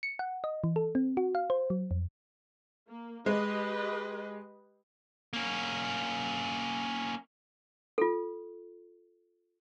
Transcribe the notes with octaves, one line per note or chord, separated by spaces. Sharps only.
C#7
F#5
D#5
E3
A4
C4
F#4
F5
C5
F#3
F2
A#3
G#3 G4 B4 D#5
A#3 C#4
F4 A4